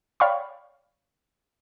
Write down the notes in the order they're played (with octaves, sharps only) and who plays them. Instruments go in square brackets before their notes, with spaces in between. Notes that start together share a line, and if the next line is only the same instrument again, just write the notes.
[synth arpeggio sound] C#5 D5 F5 G5 B5 C#6